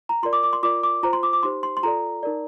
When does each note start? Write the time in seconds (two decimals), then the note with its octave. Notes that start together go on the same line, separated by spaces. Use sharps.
0.09 A#5
0.23 F4 A#4 D5 C6
0.33 D6
0.43 D6
0.53 C6
0.63 F4 A#4 D5 D6
0.83 D6
1.03 F4 C5 A#5
1.13 C6
1.23 D6
1.33 D6
1.43 D#4 G4 C5 C6
1.63 C6
1.77 C6
1.83 F4 A4 D5 A#5
2.23 D#4 A#4 D5